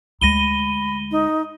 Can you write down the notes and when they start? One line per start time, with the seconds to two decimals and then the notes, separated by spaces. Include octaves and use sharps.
0.21 D2 G#3 B5 A#6 D#7 G7
1.11 D#4